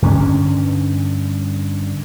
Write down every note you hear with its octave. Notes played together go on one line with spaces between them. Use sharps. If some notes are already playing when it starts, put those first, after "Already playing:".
G2 D3 C#4